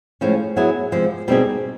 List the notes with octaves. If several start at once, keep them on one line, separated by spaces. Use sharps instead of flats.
A2 F3 G#3 C#4
F#3 B3 E4 G#4
C3 F3 G#3
B2 G3 C4 D#4 G#4